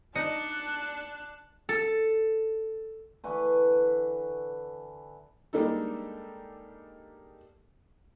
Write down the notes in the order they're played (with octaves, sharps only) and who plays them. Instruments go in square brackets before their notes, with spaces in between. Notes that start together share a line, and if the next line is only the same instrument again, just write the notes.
[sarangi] D4 [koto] D#4 [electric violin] A5 F#6 [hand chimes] C#7
[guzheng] A4
[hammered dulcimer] D3 E3 B4 C#6
[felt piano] G3 G#3 A#3 D4 D#4 A4